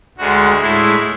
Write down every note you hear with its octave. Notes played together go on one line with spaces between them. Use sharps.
D2 D3 G#3 F#4
A2 G#3 E4